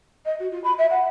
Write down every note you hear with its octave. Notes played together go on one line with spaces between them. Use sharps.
D#5
F#4
F4
B5
E5
F#5